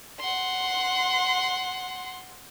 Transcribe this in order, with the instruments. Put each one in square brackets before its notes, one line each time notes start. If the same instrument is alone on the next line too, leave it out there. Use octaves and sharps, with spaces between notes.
[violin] F#5 C6